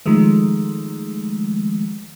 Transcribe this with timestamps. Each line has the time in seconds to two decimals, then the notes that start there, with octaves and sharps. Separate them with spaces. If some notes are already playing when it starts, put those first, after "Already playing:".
0.06 D#3 F3 G#3 A3